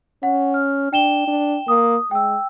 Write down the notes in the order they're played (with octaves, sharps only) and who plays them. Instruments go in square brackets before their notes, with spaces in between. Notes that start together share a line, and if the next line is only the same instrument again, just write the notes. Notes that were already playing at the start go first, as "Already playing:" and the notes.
[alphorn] C#4 [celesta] F#5
[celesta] F6
[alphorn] D4 [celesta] G5 E7 G7
[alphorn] D4
[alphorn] A#3 [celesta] D#6
[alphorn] G#3 [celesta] G5 E6